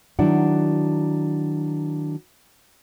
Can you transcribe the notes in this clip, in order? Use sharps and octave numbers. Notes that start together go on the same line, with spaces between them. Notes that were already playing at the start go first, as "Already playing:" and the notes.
D#3 F#3 D4 E4 D5 F#5